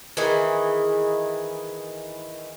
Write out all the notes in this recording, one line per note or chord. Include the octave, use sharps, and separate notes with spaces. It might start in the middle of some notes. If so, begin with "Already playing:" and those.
D#3 E3 G#4